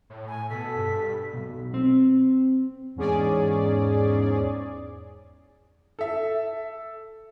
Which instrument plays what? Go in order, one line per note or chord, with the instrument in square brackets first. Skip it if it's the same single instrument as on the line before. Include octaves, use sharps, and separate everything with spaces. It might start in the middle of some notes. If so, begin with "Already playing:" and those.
[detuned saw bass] A2
[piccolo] G#5
[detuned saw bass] B2 [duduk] A4 [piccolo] B6
[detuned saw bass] G2
[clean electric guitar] B1
C4
[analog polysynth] E2 G#2 C#4 G#4 D5
[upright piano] A4 E5